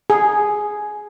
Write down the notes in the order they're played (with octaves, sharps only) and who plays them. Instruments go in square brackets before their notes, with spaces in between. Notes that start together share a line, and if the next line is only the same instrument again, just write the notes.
[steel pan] G#4